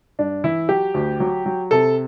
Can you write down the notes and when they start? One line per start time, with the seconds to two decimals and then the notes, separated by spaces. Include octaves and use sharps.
0.19 G2 D4
0.44 E3 E4
0.69 F#3 G4
0.94 D2
1.20 F#3
1.46 F#3
1.71 C3 A4